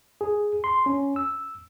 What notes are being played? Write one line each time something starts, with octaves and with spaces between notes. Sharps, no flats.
G#4
C6
C#4
E6